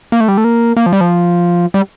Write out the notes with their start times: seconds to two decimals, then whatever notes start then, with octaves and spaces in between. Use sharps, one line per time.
0.12 A#3
0.21 A3
0.28 G3
0.38 A3
0.44 A#3
0.77 A#3
0.86 F3
0.93 G3
1.01 F3
1.74 G3